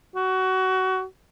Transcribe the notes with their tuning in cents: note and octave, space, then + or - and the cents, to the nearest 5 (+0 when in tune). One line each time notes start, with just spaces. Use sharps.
F#4 +20